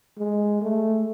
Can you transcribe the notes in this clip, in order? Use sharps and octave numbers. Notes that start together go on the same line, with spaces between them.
G#3
A3